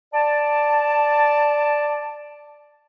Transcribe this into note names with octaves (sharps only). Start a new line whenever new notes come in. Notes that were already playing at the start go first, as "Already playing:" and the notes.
D5 A5